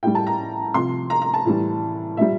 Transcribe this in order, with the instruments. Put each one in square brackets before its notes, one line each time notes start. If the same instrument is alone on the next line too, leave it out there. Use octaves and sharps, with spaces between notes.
[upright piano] A2 G3 G5
A5
A#5
C3 F3 C6
A#5
A#5
A5
A2 E3 G3
A#2 G3 E5